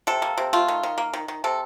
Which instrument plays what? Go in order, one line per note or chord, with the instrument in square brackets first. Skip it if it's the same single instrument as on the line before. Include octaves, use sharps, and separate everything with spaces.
[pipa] C3 A4
A#3
C3
A3 F4
D#3
D#3
A#3
D#3
D#3
C3 A4